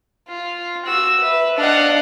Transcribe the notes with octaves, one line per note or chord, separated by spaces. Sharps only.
F4
F#4 E6
B4 E5
D4 D#5 F5 F#5